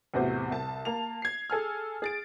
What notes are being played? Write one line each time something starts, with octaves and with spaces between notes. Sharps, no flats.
E2 A2 C3 F#4 C5
C2 A5
A#3 A5 F7
G#6 C7
G#4 A4 G#5 F6
G#4 A6 D7